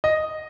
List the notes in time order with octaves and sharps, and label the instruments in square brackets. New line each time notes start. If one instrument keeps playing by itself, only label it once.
[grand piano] D#5